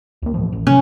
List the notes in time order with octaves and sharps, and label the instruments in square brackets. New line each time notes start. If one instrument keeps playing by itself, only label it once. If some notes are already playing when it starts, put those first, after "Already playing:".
[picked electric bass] D2 A#3
A2 E3 F3
A1
[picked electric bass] C3 F#3 [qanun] C#4